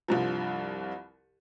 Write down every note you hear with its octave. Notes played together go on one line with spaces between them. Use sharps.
C2 G2 F3